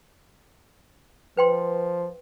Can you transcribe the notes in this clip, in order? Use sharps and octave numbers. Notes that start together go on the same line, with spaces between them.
F3 B4 G5 C6